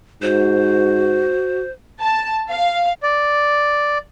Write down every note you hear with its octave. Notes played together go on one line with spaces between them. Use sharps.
G#2 F#4 C5
A5
F5
D5